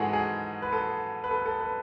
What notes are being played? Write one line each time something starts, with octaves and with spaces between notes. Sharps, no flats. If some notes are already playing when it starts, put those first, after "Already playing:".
Already playing: G#2 E3 G#3 F#4 G#4 A4
G#4
B4
A4
B4
A4
A4
B4